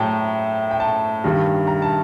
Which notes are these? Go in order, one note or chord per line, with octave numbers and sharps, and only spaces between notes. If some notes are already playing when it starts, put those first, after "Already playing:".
Already playing: A2 F#3 G5 A5 A#5
G5
A5
G2 D#3 G3
A#5
A5